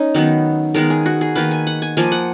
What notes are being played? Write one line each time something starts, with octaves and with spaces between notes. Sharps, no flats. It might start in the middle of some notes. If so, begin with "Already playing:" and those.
Already playing: C#4 D#4
D#3 F#3 B3
D#3 G#3 B3 A#4
G#4
F#4
G#4
D#3 A#3 B4
G#5
F#5
G#5
F3 A#3 G#5
F#5